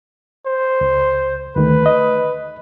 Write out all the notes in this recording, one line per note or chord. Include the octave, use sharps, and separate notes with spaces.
C5
C#2
D2 D#3 A3 B4
D#5